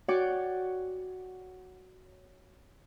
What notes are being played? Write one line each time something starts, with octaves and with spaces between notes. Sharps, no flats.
F#4 C#5 D5 F#5 G5 D6